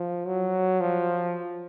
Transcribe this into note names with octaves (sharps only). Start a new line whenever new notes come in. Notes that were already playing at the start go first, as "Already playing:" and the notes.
Already playing: F3
F#3
F3